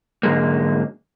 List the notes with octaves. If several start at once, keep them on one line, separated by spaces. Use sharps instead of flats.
G#2 D3 F#3 G#3 A#3